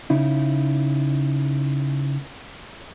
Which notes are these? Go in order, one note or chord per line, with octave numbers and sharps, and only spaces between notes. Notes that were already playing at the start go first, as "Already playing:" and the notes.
C#3 D#4 E4